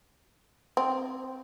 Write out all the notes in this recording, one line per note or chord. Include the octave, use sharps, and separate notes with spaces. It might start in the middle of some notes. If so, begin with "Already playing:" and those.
C4